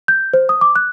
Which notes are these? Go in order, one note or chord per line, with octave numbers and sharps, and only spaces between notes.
G6
C5
D#6
D6
F#6